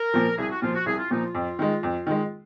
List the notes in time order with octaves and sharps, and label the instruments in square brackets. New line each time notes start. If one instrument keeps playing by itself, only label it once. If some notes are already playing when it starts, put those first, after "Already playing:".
Already playing: [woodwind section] A#4
[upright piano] A#2 F3
[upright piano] C2 [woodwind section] G#4
[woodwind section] F#4
[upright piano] A#2 F3 [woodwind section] F4
[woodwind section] F#4
[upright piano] C2 [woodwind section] G#4
[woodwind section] F4
[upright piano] A#2 F3 [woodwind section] D#4
[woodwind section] F4
[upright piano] F2
D#3 G#3
F2
D#3 G#3